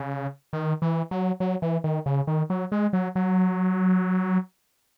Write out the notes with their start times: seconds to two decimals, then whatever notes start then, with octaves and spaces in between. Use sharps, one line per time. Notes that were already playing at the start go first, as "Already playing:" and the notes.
Already playing: C#3
0.53 D#3
0.82 E3
1.11 F#3
1.40 F#3
1.62 E3
1.84 D#3
2.06 C#3
2.27 D#3
2.50 F#3
2.72 G#3
2.93 F#3
3.15 F#3